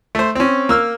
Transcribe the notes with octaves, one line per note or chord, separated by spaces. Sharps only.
A3 C5
C4 C#4
A#3 E6 F6